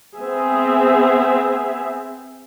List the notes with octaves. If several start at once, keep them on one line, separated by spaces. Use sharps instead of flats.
B3 C4 G#4 E5